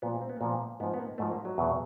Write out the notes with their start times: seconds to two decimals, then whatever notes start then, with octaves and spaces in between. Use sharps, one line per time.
0.02 A#2 F3 B3
0.21 C4
0.29 B3
0.37 A#3
0.41 A#2 F3 B3
0.80 G#2 B3
0.83 F3
0.94 B3
0.99 A#3
1.18 G#2 F3 A3
1.31 A#3
1.45 F#3
1.58 E2 B2